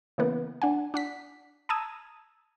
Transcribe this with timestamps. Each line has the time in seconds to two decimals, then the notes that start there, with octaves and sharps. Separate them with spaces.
0.18 C#3 E3 A#3 B3
0.62 D4 F#5 G#5
0.94 D4 F#5 B6
1.69 A5 A#5 D#6 E6 G#6